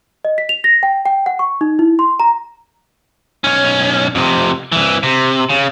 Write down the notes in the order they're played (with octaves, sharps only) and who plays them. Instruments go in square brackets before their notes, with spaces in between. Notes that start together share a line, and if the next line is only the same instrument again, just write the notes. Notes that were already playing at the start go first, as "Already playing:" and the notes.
[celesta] D#5
B6
F7
A#6
G5
G5
F#5
C#6
D#4
E4
C6
A#5
[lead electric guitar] B1 C#4
F2 C3
C2 E3
C3
C#3